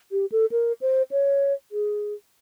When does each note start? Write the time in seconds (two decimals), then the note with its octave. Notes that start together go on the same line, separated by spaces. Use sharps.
0.12 G4
0.32 A4
0.52 A#4
0.81 C5
1.11 C#5
1.72 G#4